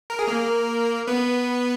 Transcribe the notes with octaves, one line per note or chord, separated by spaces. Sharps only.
A#4
G#4
A#3 A#4
B3 B4